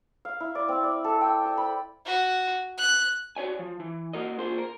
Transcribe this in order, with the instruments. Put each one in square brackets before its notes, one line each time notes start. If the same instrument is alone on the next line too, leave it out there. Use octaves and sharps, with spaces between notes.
[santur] F5
E4
D5
C4
D5
A4
G5
A5
B5
[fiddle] F#4
F#6
[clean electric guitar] F#4 C#5 D5 G#5
F3
E3
A#3 F#4 A#4 D#5
A#3 F4 G#4 C5
A#4